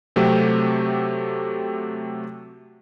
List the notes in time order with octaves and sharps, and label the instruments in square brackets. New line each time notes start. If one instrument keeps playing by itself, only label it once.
[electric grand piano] C3 F#3 A3 C4 F#4 G4